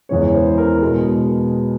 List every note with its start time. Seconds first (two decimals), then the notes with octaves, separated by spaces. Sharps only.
0.09 E2 C#3 E3 G#3 C#5
0.34 C5
0.58 A#4
0.81 B2 G#3 G#4